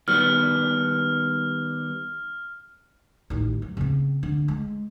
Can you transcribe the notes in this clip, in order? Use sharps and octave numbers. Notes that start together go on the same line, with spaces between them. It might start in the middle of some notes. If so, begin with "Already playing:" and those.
D#3 G3 B3 F6
A1 D#3
F#3
C#3 C4
D3
G#3